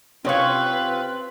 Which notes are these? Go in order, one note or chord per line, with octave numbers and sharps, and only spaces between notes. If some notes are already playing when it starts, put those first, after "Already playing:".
C3 C4 C#4 F4 B4 C#5 F5 C#6